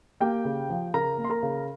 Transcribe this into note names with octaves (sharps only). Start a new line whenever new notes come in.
A#3 G4 G5
C#3
F3
C#3 A#4 A#5
A#3
C6
A#4 A#5
C#3